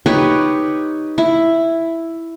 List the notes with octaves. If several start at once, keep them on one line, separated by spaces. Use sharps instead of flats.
D#4 G4 B4 C#5
E4